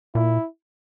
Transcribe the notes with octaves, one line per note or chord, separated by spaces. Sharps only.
A#2 E4